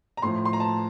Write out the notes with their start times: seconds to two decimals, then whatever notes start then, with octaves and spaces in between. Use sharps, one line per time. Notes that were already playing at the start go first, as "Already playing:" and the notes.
0.17 A#5
0.22 A2 F3 C6
0.45 C6
0.53 A#5
0.60 A5